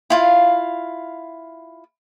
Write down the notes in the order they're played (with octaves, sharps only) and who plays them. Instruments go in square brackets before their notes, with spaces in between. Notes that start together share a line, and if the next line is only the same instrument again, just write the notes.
[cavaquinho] E4 F4 F5